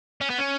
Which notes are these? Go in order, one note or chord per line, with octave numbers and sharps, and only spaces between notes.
C#4
B3
C#4